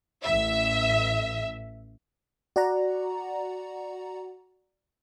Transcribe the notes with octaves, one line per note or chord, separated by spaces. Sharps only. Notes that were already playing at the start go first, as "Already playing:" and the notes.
A1 E5
F#4 D5 F#5 A#5